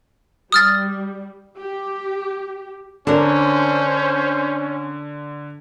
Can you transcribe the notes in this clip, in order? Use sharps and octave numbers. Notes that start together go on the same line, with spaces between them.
G3 D#6 F6 A6
G4
D3 C#4 D4 A#4 C5